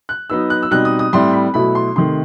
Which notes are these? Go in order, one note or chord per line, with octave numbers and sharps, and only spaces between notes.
F#6
F#3 B3 D#4 E6
F#6
E6
B2 G3 C4 D#4 F#6
D#6
D#6
A2 G3 C4 E4 C6
B5
B2 F#3 A3 E4 B5
C6
C3 D#3 A3 C6